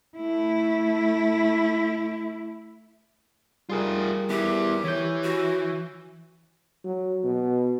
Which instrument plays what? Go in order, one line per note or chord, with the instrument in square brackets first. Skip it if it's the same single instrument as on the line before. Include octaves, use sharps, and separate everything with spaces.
[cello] A3 E4
[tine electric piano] G3 G#4 A#4 [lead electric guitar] F4 G4
[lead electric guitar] B3 E4 [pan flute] G4
[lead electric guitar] E3 [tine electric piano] C#5 G6
[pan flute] F#4
[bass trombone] F#3
B2